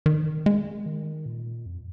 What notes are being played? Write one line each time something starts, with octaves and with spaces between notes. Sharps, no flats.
D#3
G#3
D#3
A#2
F2